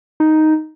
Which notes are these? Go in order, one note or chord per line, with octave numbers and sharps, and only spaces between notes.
D#4